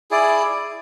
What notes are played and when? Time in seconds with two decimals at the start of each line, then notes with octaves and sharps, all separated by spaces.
0.11 E4 G#4 D5